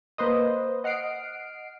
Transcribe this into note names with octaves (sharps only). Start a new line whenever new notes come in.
A#3 B4 C5 D#5
D#5 F#5 F6 C7 D7